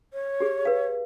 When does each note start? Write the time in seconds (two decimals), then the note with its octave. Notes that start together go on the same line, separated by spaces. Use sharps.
0.13 C#5
0.40 G4 G#4
0.65 B4 F5